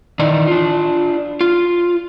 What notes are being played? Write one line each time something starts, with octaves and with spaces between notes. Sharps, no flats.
D#3 E3 D#4 D5
D4 F4
F4